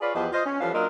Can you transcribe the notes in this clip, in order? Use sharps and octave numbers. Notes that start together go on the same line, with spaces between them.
F4 G#4 B4 C#5 D5
E2 F3 B3 G4 B4 D#5
F4 C5 D#5
C#4
E3 F3 G3 C#4 A4 F5
F#3 A#3 D4 F4 A#4 D#5